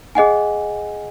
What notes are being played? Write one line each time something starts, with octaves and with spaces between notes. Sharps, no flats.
G#4 D#5 F#5 G#5